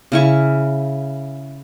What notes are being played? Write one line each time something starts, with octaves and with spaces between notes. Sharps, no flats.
C#3 E4 C#6